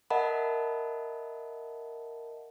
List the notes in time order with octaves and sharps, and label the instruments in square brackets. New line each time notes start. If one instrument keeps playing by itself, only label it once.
[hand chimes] A#4 D#5 E5 F#5 A5 B5